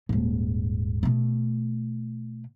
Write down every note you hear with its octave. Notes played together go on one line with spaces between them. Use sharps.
D#1 G#2
B2 A3